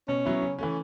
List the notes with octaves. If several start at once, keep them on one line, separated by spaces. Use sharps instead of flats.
B2 C#4
F#3 B3 E4
C#3
E3 A3 C#4